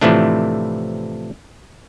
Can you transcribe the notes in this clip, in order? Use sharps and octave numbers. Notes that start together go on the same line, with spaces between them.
A2 C3 E3 F3 A3 D4